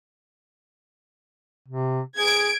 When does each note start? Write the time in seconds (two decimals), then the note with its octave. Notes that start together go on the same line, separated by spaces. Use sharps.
1.69 C3
2.17 G#4 G#6 D7